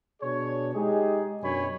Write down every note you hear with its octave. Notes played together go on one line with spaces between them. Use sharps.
B2 D4 G#4 C#5
G#3 D#4 G4 G#4
F#2 B2 D4 C#5 G#5 B5